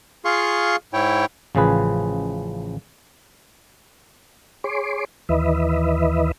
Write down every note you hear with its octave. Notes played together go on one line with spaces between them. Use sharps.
F4 G#4 F5 C6 C#6
G#2 E4 C#5 G5
A1 C#3 F3 G#4 B4
G#4 C#5 C6 D6
D#2 E3 B4 D#5 E5